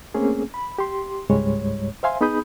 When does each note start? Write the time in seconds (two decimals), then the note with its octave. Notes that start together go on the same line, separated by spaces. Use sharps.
0.14 A3 A#3 C4 C#4 G#4
0.54 B5
0.78 G4 C6
1.30 C#2 G#2 G3 G#3 C#5
2.03 C5 E5 F5 G#5 C6
2.21 B3 D#4 G#4 B5 D#6 G6